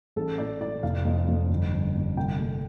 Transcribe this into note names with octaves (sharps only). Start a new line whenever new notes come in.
A1 A4
A2 D5
A2 D5
F1 F5
F2
F2
G1
G1
G1
C2 G5
A3